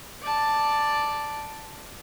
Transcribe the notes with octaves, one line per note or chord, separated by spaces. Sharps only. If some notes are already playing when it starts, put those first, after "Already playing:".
D5 A5